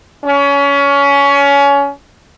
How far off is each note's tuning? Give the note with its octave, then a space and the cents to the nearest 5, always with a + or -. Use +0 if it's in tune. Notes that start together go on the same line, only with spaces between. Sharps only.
C#4 +25